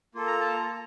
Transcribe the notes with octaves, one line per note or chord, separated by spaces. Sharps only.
A#3 F4 A4
A#5
A5
A#5